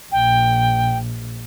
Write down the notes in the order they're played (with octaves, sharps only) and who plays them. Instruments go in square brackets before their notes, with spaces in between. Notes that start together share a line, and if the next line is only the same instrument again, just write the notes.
[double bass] A#1 [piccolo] G5